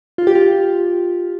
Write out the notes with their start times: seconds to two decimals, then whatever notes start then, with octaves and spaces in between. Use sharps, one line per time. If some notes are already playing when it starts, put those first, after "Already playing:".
0.18 F4
0.27 G4
0.35 F4